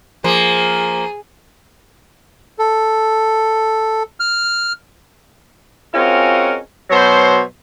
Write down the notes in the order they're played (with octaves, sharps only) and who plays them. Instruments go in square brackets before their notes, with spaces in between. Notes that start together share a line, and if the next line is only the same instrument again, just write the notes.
[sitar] F3 A#3 [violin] G#4
[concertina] A4
F6
[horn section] G#3 C4 C#4 F4 F#4 A#4
B2 F#3 C5